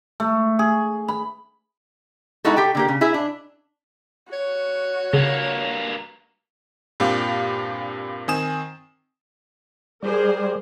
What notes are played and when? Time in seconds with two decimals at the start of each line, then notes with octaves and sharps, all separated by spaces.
0.20 A3
0.59 G#4
1.08 B5
2.44 G#3 B3 D#4 E4 F#4 A4
2.56 G4 A4 G5
2.75 D3 A#3 G4
2.88 C#3
3.01 E4 G#4 E5
3.14 D4
4.33 F#4 C#5
5.13 G2 C#3 A#3
7.00 G2 A#2 C4 G4 F5
8.28 D#3 C4 G#5 D#6 E7
10.03 G3 G#4 A#4 C5